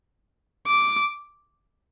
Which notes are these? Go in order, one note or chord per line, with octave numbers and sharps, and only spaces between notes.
D6